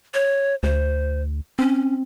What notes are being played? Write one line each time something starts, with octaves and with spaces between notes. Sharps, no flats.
C#5
D2 C5
C4 C#4